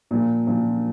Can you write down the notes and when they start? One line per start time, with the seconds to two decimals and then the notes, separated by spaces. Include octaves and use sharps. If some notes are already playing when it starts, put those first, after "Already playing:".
0.11 A#2 F3
0.47 A#2 F3